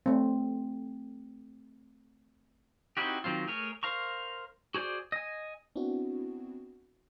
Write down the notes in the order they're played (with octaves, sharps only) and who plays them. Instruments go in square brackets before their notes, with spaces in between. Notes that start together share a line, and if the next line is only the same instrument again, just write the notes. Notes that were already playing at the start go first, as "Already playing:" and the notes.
[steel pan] A3 C4
[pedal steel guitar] C4 D#4 E4 F#4 G4
D#3 F#3 C4 F4
A3 G#4 A#4 C#5
A#4 C5 F5 A#5 C#6
F#4 G#4 C5 D5
D#5 G#5
[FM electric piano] B3 C4 D4 E4 F#4